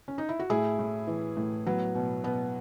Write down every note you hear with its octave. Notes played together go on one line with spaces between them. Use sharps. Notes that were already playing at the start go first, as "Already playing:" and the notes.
C#4
D#4
E4
F#4
A2 E4 G#4
A2
E3
A2
F#3 B3
B2
B2 B3